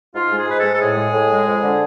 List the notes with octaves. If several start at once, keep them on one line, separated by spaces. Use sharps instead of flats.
G#2 F4
G#3
G#4
G#2 B4
A4
G#3
A4
A2 G#4
G#3
A2
G#3
F2
D3